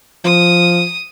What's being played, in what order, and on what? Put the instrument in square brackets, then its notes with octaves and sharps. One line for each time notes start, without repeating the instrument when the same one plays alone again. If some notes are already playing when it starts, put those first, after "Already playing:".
[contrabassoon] F3 [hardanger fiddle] D#6